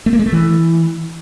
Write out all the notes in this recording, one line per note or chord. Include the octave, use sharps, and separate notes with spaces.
A3
A#3
G#3
A3
E3